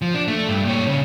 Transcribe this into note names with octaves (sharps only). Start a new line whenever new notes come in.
F3
D4
A3
G2
A#2 C#5
C#3